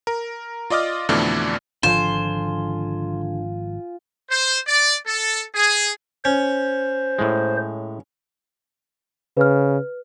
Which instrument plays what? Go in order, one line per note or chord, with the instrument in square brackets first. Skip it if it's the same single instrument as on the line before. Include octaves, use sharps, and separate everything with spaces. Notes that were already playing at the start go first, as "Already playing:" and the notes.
[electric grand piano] A#4
F4 D5 D#5 D6 F6
F2 B2 D3 E3 A3 D5
[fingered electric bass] G#1 F3 [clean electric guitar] D3 [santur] F4 G#5 [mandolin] C5
[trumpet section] C5
D5
A4
G#4
[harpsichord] C#4 [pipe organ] C5
[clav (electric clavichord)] A2 G#3
[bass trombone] C#3 [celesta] B4 F6